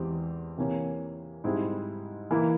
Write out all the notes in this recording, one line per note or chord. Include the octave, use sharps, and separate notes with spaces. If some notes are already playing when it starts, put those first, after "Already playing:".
Already playing: E2 E3 G#3 C4 G4
C3 E3 A#3 C#4
G#2 G3 C4 E4 G#4
E3 A#3 E4